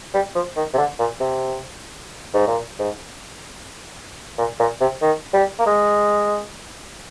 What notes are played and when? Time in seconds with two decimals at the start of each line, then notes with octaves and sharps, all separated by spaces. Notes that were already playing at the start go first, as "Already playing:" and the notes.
0.14 G3
0.35 F3
0.56 D#3
0.74 C3
0.78 D3
0.99 A#2
1.20 C3
2.34 G#2
2.47 A#2
2.79 G#2
4.38 A#2
4.59 A#2
4.80 C3
5.02 D#3
5.34 G3
5.59 A#3
5.66 G#3